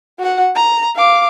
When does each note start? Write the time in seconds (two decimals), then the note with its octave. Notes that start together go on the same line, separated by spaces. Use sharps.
0.19 F#4 F#5
0.55 A#5
0.96 F5 D6